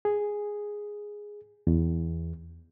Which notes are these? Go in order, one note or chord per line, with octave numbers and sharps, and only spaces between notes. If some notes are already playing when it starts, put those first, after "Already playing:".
G#4
E2